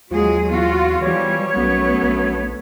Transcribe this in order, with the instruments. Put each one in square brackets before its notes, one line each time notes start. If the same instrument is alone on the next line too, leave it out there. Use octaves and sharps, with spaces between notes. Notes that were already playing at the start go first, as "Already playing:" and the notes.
[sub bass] D#2 [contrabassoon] F3 [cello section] F#3 G#3 G#4
[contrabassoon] E2 [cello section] F4 F#4
[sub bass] E3 [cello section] F3 G3 [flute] C#5
[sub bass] B1 [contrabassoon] F#2 [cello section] A3 B3
[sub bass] A#1